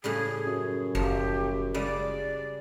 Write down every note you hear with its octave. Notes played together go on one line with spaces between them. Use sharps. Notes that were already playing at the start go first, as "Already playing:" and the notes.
A2 C#3 G3 G#4
F#2
F#1 F3 G4
C#3 G3 G#3 D5